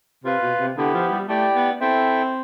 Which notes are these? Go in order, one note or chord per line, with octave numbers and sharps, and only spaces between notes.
C3 F4 B4 F5
B2
C3
D3 B3 E4 G4
F3
G3
A3 E4 G4 D5 G5
B3
C4 E4 A4 E5 G5